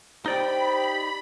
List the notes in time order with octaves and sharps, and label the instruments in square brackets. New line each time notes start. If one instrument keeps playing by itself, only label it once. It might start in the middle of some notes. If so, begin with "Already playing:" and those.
[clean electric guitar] D#4 D5 G5 [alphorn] G4 [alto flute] C5 [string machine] B5